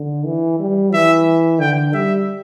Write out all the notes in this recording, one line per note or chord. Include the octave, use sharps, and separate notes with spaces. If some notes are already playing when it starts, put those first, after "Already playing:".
Already playing: D3
E3
G3
E3 E5
D3 G5
G3 E5